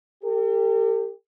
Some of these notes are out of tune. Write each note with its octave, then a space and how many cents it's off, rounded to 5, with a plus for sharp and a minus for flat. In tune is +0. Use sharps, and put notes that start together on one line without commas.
G4 +15 A#4 -45